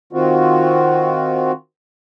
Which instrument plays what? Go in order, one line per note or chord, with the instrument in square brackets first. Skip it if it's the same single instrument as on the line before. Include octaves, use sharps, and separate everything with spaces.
[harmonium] D#3 C4 F4 F#4